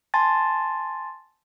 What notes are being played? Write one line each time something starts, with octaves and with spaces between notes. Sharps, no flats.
G#5 A5 C6 A6